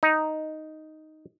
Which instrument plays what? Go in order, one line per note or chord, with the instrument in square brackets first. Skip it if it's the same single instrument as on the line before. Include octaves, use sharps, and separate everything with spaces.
[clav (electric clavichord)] D#4